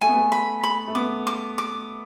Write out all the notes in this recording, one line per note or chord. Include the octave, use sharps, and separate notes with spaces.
A3 G#5
B3
A3
B5
B5
A3
B3 D6
D6
D6